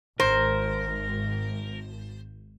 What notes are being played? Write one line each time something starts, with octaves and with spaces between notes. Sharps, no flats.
G#1 A#4 C5